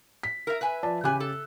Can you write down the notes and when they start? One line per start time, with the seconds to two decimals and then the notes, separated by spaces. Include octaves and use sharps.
0.23 B6
0.47 A#4 E5
0.61 B4 E5 G#5
0.83 F3 D5 A5
1.04 C#3 E3 G4 G#5 F#6
1.20 A4